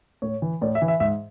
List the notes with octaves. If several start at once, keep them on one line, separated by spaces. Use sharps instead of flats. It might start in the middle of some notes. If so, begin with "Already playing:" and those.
A2 C#5
E3
A2 D5
E5
E3
E5
G#2 E5